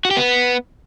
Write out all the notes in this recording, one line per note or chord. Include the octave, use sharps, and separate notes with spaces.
F#4
G4
B3